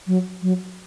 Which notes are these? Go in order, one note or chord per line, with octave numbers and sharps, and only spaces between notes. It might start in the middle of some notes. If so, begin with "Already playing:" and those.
F#3
F#3